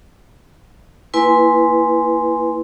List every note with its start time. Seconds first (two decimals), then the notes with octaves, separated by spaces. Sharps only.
1.14 A#3 E4 B4 G#5 C6